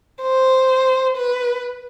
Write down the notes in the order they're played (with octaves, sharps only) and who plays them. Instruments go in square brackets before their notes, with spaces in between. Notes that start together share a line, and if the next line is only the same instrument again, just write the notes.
[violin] C5
B4